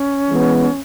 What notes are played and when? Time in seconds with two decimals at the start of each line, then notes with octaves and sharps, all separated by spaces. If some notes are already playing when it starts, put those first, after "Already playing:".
Already playing: C#4
0.30 E3 G#3 B3